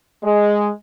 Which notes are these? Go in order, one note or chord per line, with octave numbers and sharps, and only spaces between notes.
G#3